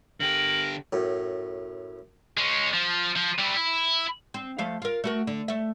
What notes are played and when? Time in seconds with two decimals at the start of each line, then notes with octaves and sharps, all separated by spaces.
0.20 D3 G4 A#4 F#7
0.93 F#2 A2
2.37 G#3 C#4
2.73 F3
3.16 F3
3.38 G3 E4
3.57 E4
4.34 C4
4.58 F3 A3 F5
4.82 F4 A#4
5.04 A3 F#4 A#4
5.27 D3
5.48 A3 E5